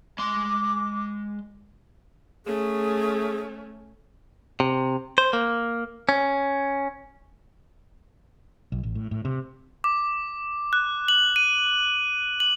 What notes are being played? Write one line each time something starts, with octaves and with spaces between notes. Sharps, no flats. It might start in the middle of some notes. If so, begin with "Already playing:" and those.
G#3 C6 D6
A3 C#4 G#4
C3
C5
A#3
C#4
B1
A1
A2
A2
C3
D6
F#6
F#7
D#7
F#7